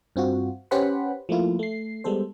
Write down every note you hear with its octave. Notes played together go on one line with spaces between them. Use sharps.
G2 C4 F4 F#4
C#4 G4 B4 C5 F#5 B5
F3 A3 A#3 E4 F4
A3 C7
G3 G#3 B3 A4 C5